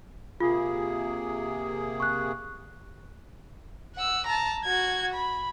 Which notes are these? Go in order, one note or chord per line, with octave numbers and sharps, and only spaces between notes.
C3 A#3 F4 G#4
C#6 F#6
F#5 E6
A5 A#5
F#4 G#6
B5